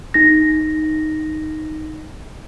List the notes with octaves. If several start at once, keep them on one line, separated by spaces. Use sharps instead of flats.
D#4 A#6